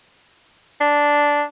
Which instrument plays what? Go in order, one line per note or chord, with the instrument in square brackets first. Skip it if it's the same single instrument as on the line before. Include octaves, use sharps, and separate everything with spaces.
[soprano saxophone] D4